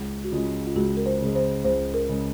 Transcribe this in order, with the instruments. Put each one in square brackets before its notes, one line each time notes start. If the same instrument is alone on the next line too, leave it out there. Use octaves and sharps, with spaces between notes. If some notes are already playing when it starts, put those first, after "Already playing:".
Already playing: [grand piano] C#2
[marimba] F#4
[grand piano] C#3 G#3 [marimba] F4
[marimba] F4
[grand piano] C#2 [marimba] F#4
[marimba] A#4
C5
[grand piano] C#3 G#3
[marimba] C5
[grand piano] C#2 [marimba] C5
[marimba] A#4
[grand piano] C#3 G#3